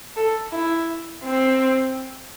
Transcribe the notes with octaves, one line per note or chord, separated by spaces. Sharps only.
A4
E4
C4